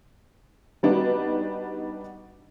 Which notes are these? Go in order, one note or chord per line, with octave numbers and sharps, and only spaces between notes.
G3 B3 D4 D#4 F#4